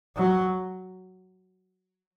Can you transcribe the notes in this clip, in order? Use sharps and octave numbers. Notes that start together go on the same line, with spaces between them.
F#3